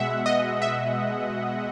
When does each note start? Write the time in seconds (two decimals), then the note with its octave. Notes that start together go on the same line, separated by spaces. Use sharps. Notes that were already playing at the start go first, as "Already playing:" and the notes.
Already playing: B2 G#3 E5 F#5
0.26 D#5
0.62 E5